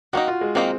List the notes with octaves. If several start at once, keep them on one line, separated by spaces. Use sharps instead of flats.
D#3 A#3 D#4 F#4
F4
G#3
D#3 A#3 C4 D#4